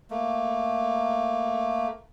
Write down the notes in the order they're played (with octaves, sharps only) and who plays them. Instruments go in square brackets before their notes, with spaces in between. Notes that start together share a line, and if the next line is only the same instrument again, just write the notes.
[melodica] A3 A#3